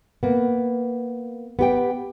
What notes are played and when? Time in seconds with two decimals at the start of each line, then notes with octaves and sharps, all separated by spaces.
0.23 A#3 B3
1.59 B3 G4 G5